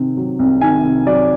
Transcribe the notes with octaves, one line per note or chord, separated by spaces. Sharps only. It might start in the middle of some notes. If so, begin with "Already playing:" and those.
Already playing: C3 D#3
F#3
C2
D#3 G#5
C3
F#3 D5